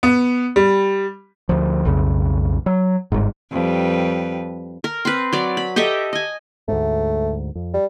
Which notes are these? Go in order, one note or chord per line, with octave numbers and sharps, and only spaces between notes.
B3
G3
D2 F3
B1 F2 C#3
F#3
G1 G#2
F2 G3 B4
A#4
C4 B4
F#3 D5
B5
G4 A4 D#5 E5
D#5 G#5
D2 G#2 A3
F2
G3